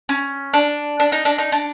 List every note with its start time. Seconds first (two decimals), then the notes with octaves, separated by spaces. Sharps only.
0.09 C#4
0.54 D4
1.00 D4
1.12 D#4
1.25 D4
1.38 D#4
1.52 D4